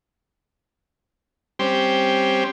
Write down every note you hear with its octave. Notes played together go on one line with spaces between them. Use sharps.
G3 C4 C#4 G4 C5